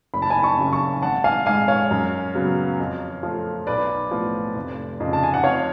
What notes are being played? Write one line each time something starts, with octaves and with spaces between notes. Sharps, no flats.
F#1 B5
A5
G#5 B5
A5 C#6
F#2 C#3
A5 C#6
G#1 F#5 A5
F5 G#5
G#2 G#3 F5 G#5
C#5 F5
F#2
C#3 F#3 B3
F2
F3 A3
B1 B4 D5
A2 F3 B3
F1
F2 C#3
A5
G#5
F#5
F2 C#5 F5